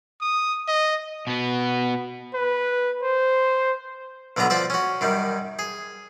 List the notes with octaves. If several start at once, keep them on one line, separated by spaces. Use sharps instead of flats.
D#6
D#5
B2 B3
B4
C5
B1 D3 F#3 B3 A#5
F3 D5 E5
C#4 F#4
F#2 D#3 G3
G#4